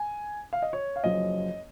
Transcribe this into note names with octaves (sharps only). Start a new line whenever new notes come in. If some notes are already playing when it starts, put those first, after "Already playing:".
Already playing: G#5
F5
D#5
C#5
F5
F#1 F#2 F3 D#5